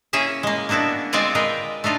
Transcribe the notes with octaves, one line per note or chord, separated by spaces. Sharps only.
A#3 C#4 E4 G#4 E5
G#3 A#3
A#3 B3 D4 E4 F#4
G#3 C4 F4 D5 F#5 G#5
G#3 G#4 A#4 B4 G5
A3 D4 D#4 F4